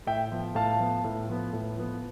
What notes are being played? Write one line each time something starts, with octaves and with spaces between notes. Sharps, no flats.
A2 E5 G5
F3 B3
A2 F5 A5
F3 B3
A2
F3 B3
A2
F3 B3